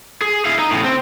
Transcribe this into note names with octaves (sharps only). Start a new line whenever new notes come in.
G#4
E4 F5
D#4
A2 C#3
C4